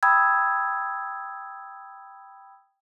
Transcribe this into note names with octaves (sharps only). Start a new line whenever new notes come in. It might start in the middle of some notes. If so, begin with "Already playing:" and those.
G5 B5 D#6 E6 G#6